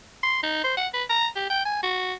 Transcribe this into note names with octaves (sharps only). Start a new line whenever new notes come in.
C6
D#4
C5
F#5
B4
A#5
G4
G5
G#5
F#4